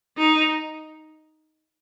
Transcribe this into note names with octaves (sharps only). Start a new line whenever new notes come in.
D#4